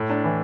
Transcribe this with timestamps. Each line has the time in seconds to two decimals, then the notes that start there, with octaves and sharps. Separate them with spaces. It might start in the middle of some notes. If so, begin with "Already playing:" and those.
Already playing: A2
0.10 D4
0.24 E3